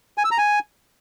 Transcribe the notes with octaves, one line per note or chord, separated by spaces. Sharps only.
G#5
E6
A#5
G#5